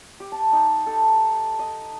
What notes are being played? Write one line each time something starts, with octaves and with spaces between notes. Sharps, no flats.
G4
A5
D#4
A4
D#5